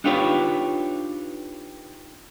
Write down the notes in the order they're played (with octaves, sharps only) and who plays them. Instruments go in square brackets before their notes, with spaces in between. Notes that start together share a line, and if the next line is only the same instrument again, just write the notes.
[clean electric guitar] D4 D#4 F4 G4 B4 C#5